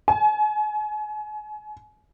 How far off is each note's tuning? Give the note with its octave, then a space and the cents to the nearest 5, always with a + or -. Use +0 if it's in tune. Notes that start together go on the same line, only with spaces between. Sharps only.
G#5 +35